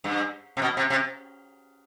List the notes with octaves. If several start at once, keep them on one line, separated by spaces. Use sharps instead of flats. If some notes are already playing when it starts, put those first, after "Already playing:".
G2
C3
B2
C3
C3